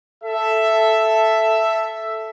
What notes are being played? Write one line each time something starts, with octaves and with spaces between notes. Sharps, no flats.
A4 E5